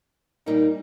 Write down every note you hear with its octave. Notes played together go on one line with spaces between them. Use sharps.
A#2 G3 A#3 D#4